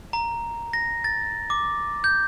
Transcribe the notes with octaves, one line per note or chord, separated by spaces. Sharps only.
A#5
A#6
A6
D6
G6